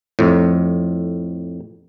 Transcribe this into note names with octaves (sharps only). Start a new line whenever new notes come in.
F2 A2